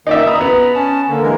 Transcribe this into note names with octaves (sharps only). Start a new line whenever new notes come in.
D#3 A#3 D#4 D5 E5
A#5 B5 D#6
B3
C#4 A5
D3 A#3
E3 G#3 A#4